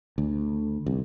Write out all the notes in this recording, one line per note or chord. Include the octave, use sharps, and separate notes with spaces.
D2
C2